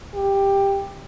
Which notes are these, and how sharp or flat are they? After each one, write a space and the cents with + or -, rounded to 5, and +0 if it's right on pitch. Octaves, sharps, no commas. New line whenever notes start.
G4 +10